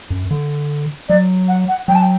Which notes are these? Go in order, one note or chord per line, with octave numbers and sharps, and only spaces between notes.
F#2
D3
F#3 D5
F#5
F#5
F#3 G5
A5
G5